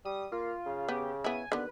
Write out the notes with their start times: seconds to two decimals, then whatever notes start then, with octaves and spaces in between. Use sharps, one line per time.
0.05 G3 D#6
0.32 A#3 F4
0.66 C#3
0.88 B3 G4
1.24 B3 E4 G#5
1.52 D#2 D3 B3 B4